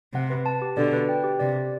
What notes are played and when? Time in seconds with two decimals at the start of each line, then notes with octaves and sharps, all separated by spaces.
0.14 C3 F#5
0.30 B4
0.46 A5
0.62 G4
0.77 B2 D3 D5
0.93 B4
1.09 G5
1.24 G4
1.39 C3 D5
1.56 G4